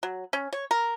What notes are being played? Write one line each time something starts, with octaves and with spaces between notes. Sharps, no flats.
F#3
C#4
C#5
A#4